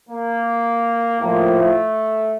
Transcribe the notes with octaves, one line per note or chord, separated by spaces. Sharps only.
A#3
A2 F3 A#3
A3